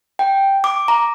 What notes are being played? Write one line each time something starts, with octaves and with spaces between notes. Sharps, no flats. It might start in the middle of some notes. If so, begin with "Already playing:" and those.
G5
D6
A#5